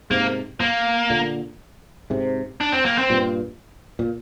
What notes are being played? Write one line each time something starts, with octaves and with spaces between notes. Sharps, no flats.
G#2 C3 A#3
A#3
A#2 D3
G#2 C3
D4
C4
A#3
C4
G2 A#2
A#2